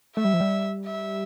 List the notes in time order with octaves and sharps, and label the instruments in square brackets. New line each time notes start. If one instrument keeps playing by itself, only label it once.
[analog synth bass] A3 [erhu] E5
[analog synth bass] G3
F3
G3
[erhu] E5